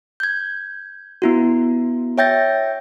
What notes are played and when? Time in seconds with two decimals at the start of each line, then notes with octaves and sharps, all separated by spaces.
0.20 G6 G#6
1.22 B3 E4 F#4
2.18 C#5 E5 G5 G6 A6 A#6